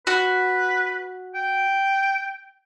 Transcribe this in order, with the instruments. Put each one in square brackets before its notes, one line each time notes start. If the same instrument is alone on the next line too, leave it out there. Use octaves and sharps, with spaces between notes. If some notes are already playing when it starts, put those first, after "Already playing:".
[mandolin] F#4 [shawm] B4
[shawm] G5